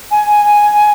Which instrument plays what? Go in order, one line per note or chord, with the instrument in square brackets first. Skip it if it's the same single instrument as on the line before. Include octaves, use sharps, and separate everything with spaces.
[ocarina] G#5